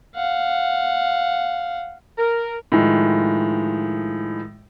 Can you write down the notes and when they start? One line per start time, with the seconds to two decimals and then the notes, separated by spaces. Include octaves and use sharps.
0.16 F5 F#5
2.18 A#4
2.72 A2 D#3 F3 G#3